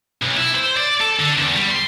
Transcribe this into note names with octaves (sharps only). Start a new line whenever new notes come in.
B1
E4
C5
D5
A4
D3
E2
G3
C6